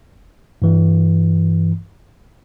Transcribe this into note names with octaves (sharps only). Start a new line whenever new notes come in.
G2 E3